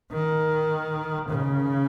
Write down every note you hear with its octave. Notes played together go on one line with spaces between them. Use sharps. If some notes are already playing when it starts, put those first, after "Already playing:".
D#3
C#3